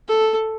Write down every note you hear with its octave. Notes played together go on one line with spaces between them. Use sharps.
A4